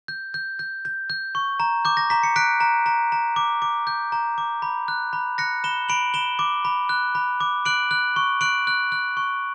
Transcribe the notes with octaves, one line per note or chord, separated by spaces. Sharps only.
G6
G6
G6
G6
G6
C#6
A#5
D6 G6
A#6
A#5 B6
C#7
F#6 B6 D7
A#5
A#5
A#5
D6
D6
G6
A#5
D6
B5
F#6
B5
F#6 A#6 C#7
B5 E7 G7
B5 D7 F#7
B5 E7 G7
D6
B5
F#6
B5
D6
F#6 D7 F#7
F#6
C#6
F#6 D7 F#7
F#6
F#6
C#6